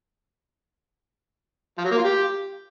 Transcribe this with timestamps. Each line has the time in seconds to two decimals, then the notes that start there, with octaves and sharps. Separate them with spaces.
1.78 F3
1.84 F#3
1.91 A#3
1.98 F4
2.04 G4